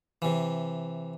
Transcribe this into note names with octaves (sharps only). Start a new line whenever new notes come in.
C3 E3